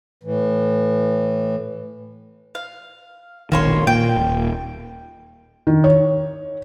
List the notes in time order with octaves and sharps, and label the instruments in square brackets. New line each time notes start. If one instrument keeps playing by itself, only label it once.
[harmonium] A2 E3
[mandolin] F5
[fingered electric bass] E1 A#1 D#3 [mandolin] A#3 C#5 C6
[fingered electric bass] A#2 [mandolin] G5
[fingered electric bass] D#1
[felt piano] D#3
C#5